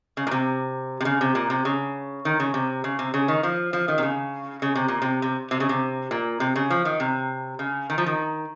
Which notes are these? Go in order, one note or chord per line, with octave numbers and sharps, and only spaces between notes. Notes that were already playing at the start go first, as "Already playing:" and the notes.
C#3
A#2
C3
C3
C#3
C3
A#2
C3
C#3
D#3
C#3
C3
C#3
C3
C#3
D#3
F3
F3
D#3
C3
C#3
C#3
C3
A#2
C3
C3
C3
C#3
C3
A#2
C3
C#3
F3
D#3
C3
C#3
D#3
F3
D#3